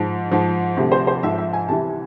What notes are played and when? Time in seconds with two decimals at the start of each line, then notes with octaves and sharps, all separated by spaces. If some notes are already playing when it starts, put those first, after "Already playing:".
Already playing: G#2 F3
0.32 G#2 F3
0.77 D2 C3 F3
0.92 C5
1.07 C5
1.23 G#2 F3 E5
1.38 E5
1.53 G#5
1.69 C2 C3 E3 A5